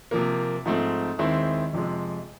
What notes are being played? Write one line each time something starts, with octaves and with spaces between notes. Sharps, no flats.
C3 F3 A#3
G#2 F3 A3 C4
D#2 D#3 G#3 C4 E4
F2 C3 F3 G#3